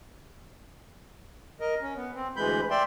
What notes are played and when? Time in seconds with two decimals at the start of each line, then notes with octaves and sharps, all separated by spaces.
1.60 A#4 D#5
1.81 C#4
1.96 B3
2.15 C4
2.36 D2 E3 G#3 B5 G6
2.71 D5 E5 G5 C6